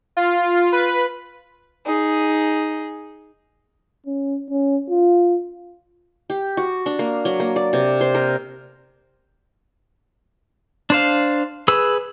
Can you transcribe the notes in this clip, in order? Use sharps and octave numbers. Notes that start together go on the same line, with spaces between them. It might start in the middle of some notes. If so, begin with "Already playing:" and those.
F4
B4
D#4 G#4
C#4
C#4
F4
G4
F#4
D4
A#3
F#3
A#3
D5
C3
C5
A#4
D4 C5 F5
G#4 B4 E6